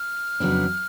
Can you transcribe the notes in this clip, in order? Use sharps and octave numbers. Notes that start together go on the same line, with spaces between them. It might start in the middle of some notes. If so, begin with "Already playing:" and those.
Already playing: F6
F2 C#3 F#3 B3 D4